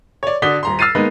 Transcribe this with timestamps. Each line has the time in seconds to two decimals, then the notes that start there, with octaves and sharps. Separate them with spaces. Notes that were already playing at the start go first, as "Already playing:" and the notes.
0.23 C#5 D5
0.42 D3 F#4 D5 D#6 B6 G7
0.63 D#1 A#5 C6
0.79 E6 F6 A6 C7 D#7
0.95 G#3 A#3 B3 D#4 B4